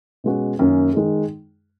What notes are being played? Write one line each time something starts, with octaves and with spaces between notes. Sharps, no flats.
B2 G#3 C#4 F#4
F#2 D#3 A#3 C#4
D#3 G#3 D#4 G#4